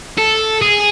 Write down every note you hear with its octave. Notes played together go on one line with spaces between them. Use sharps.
A4
G#4